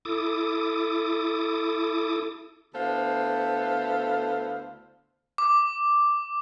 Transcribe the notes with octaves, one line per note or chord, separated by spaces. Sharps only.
E4 A4 D6 D#6
D2 B3 E4 A4 C5 F5
D6